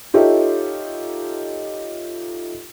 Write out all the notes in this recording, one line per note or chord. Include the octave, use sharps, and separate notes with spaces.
D#4 F4 G4 A4 C#5 E5